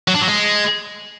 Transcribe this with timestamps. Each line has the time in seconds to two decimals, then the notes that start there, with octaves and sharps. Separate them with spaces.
0.08 F#3
0.14 D4
0.21 F#3
0.28 G#3